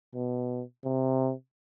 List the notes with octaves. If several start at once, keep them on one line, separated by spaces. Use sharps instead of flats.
B2
C3